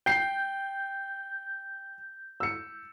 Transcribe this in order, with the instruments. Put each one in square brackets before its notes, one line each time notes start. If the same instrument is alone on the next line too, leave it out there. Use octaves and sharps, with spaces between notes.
[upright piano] G5 C7 [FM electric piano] G6
[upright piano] E6 C#7